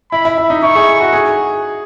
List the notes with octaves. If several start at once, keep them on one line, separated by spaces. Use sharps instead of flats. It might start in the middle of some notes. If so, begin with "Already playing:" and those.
E4 B5
E4
E4
D#4
E4 C#6
G#4
F#4
G#4